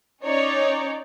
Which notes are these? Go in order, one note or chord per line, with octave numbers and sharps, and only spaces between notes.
C#4 D#4 C#5 D5